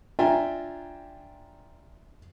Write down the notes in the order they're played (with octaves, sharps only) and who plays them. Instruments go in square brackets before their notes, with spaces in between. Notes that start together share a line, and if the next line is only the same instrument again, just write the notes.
[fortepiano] D4 F4 E5 G5 G#5 A#5